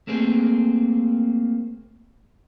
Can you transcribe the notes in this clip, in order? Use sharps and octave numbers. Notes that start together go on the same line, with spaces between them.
A3 A#3 C4 G#4